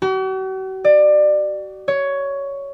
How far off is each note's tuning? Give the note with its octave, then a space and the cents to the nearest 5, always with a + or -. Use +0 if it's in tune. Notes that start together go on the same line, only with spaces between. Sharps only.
F#4 +45
D5 +25
C#5 +10